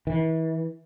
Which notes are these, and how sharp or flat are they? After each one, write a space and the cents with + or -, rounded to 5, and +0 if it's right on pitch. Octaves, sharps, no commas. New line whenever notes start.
E3 -35